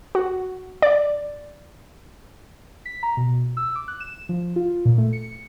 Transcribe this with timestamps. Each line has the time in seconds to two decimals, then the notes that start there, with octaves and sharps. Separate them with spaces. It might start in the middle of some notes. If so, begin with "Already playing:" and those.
0.15 F#4
0.82 D5
2.85 B6
3.03 A#5
3.17 B2
3.57 E6
3.75 D6
3.88 F#6
4.00 E7
4.29 F3
4.56 F4
4.85 A#2
4.98 A3
5.13 C#7